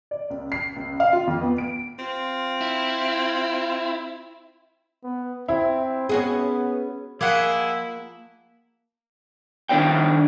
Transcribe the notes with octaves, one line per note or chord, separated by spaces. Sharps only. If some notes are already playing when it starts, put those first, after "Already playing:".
D5
C#2
C7
C#2
F5
F4
F2
B3
D7
C4 F4
E4
B3
C4 E4
B3 C#4 F#4 G#4
F3 A#3 E4 G#4 D#5 F#5
D#3 D4 A4 C5 D5 G5